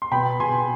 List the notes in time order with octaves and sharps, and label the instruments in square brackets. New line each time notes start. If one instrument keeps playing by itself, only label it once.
[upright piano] C6
B2 G5 B5
B2 G#5 C6